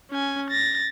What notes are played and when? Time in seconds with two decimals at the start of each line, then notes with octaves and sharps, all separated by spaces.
0.10 C#4 G#5
0.50 A6 A#6